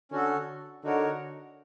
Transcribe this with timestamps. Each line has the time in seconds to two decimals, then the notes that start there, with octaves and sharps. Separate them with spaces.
0.12 D3 C#4 F#4 A4
0.85 D3 D#4 F#4 A#4 C#5